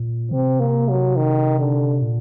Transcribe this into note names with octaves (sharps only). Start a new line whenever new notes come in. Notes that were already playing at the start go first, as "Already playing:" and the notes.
Already playing: A#2
C3 C4
A#3
F#3
D#3
D3
A#2